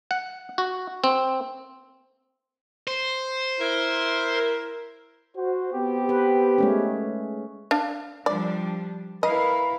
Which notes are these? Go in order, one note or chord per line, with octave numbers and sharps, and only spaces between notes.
F#5
F#4
C4
C5
E4 A#4
F#4 C5
B3 C4 G4
B4
G#3 A3 C#4
D4 F5
F3 G3 D4 D5
E4 A#4 B4 D#5 F5